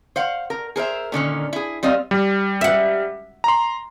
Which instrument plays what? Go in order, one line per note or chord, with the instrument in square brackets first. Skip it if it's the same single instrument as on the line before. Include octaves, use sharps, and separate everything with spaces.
[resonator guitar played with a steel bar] C5 F5 F#5
A#4
G#4 A#4 C5 E5
A#2 D3 D#3 C#4
E4 G#4
G3 C4 D#5 F5
[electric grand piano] G3
[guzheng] E5 F#5
[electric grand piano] A#5 C6